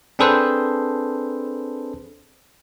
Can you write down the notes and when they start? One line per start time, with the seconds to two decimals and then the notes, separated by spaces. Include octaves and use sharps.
0.19 C4 D4 G#4 A4 B4 C5